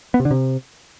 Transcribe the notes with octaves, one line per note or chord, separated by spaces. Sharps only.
B3
C3
D3
C3